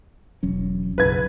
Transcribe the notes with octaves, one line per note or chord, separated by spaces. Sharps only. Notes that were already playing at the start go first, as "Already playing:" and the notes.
E1 F#3 C#4
B1 F#2 C#3 B4 G#6